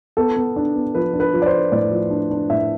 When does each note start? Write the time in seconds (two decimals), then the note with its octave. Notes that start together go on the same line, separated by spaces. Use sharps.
0.17 B3 A4
0.36 B3
0.56 D4
0.75 B3
0.95 F3 B4
1.14 D4
1.20 B4
1.34 F3
1.42 D5
1.46 C5
1.52 D4
1.72 A2 D5
1.91 F3
2.10 D4
2.31 D4
2.50 A2 E5